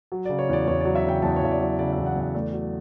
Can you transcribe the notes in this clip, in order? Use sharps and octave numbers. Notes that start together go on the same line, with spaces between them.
F#3
C#3 D5
C#5
E2 D5
E2 C#5
F#3 D5
E5
C#3 G5
E2 A5
C#5
E2 E5
D5
F#3
C#5
C#3 D5
E5
E2
F#5
E2
F#5
A3 D5
F#3